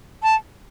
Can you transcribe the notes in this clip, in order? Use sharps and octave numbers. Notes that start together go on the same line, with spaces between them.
A5